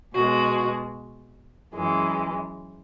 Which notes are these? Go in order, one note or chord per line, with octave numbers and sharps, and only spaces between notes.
B2 G#3 F#4
F#2 E3 G#3